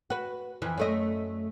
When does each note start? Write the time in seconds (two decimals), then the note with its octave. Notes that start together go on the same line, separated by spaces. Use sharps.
0.10 F#4 B4
0.62 F2 E3
0.78 F#2 A3 D#5